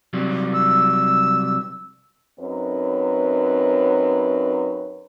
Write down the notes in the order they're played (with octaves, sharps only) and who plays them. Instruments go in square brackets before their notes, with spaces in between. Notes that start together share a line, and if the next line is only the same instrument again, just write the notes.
[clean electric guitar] C3 F#3 G3
[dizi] E6
[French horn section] F#2 C4 D#4 B4 C#5